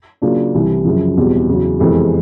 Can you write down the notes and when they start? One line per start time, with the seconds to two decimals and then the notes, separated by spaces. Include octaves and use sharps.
0.22 C#3 F#3 A#3 D4 F4
0.54 C2 C3 E3
0.85 F#2 C#3 F3
1.17 E2 B2 G3 C4
1.49 E2 C#3 F#3
1.79 F2 C3 E3 G#3 B3